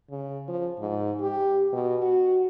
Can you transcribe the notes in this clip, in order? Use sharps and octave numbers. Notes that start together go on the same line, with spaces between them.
C#3
F3
G#2
G4
B2
F#4